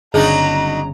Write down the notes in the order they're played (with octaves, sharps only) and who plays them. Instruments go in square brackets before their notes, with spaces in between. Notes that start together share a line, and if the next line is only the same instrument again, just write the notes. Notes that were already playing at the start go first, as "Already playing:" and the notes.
[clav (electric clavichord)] G1 C#3 G#5 [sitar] F#3 D4 D#4 [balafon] G#4 [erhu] A#5